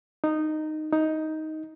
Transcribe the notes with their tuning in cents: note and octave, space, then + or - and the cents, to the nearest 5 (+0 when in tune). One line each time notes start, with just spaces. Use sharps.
D#4 -10
D#4 +10